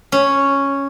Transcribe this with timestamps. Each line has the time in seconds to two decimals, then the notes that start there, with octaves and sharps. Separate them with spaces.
0.12 C#4